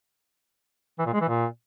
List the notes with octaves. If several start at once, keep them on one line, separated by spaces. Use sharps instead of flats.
E3
A#2
G#3
E3
A#2